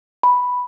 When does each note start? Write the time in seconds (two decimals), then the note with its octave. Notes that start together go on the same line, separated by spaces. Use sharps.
0.23 B5